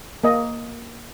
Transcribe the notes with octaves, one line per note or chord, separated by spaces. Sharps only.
A#3 D#5